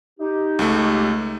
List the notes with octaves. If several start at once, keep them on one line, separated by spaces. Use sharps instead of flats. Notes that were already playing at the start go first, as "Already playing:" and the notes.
D#4 G4
C#2 A3